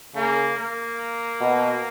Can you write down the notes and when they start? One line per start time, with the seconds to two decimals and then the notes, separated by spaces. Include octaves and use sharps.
0.15 C#3 A#3
0.58 A#3
1.40 B2